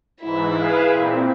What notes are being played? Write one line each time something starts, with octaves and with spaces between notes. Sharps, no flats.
G#2 E3 E4
G#4 B4 F5
A#2 C4